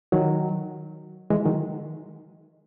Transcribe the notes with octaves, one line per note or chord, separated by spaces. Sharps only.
D#3 F#3
E3 G#3
D#3 F#3